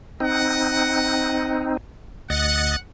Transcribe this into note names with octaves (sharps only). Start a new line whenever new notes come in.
C4 D#4 D#5 F#5
D2 D#5 F#5 A6